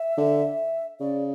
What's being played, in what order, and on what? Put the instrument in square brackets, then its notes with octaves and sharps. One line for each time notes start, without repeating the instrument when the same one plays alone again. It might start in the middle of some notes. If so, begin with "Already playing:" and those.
Already playing: [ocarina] E5
[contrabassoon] D3
[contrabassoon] C#3 [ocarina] D5